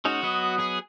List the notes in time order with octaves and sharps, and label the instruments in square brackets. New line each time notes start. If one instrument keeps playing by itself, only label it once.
[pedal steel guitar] G#3 C#4 D#4 [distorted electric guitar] F#4
[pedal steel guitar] F#3 B3 D#5
[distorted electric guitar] G#4